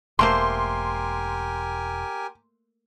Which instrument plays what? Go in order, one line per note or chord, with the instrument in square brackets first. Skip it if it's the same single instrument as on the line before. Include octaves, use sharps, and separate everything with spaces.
[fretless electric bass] E1 [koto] A3 A#3 C5 [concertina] G4 A#4 G#5 [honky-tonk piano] C6